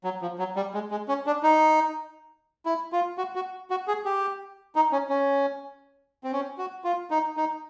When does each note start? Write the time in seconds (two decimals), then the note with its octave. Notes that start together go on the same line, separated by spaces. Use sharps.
0.04 F#3
0.22 F3
0.39 F#3
0.56 G3
0.74 G#3
0.91 G#3
1.08 C#4
1.26 D4
1.43 D#4
2.66 E4
2.92 F4
3.18 F#4
3.35 F#4
3.70 F#4
3.88 G#4
4.05 G4
4.76 D#4
4.92 C#4
5.09 C#4
6.24 C4
6.33 C#4
6.58 F#4
6.84 F4
7.11 D#4
7.37 D#4